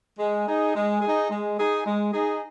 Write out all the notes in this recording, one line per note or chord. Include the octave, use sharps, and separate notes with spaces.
G#3
D#4 G#4
G#3
D#4 G#4
G#3
D#4 G#4
G#3
D#4 G#4